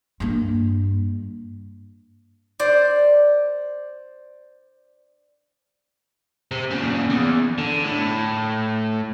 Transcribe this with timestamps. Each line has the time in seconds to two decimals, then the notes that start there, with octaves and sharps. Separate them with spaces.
0.20 G2 A#3
2.59 C5 D5
6.51 C3
6.71 A#2 C#3
7.10 E2
7.58 D3
7.84 A2